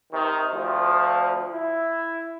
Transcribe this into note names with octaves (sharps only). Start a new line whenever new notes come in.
C3 D#3
D2 F3
E4